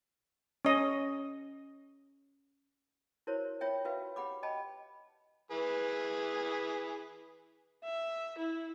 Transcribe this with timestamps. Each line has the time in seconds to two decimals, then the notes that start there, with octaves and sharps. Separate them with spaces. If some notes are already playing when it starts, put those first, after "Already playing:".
0.65 C#4 D#5
3.27 E4 F#4 A#4 C5 C#5
3.61 F4 C#5 E5 G5
3.85 F4 F#4 B4 E5 F5
4.16 G4 F#5 B5 D6
4.43 D#5 G5 A5 B5
5.51 E3 G#4 B4
7.84 E5
8.38 E4